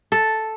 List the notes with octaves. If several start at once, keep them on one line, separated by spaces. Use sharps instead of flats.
A4